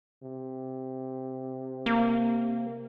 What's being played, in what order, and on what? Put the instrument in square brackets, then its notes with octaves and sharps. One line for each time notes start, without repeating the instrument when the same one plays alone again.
[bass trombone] C3
[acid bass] A#3